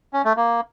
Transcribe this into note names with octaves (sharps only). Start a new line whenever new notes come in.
C#4
A3
A#3